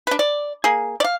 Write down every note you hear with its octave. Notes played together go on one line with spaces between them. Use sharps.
D4 B4
D5
A#3 G#4
D5 F5